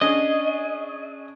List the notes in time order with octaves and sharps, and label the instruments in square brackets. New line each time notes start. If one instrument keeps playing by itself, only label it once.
[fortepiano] C#4 D4 G#4 [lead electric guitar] D#5